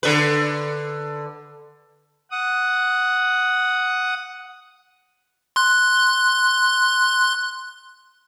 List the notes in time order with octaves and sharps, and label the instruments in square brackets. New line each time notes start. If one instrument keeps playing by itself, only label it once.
[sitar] D3 B4
[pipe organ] F#5 D#6
[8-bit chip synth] C6 F#6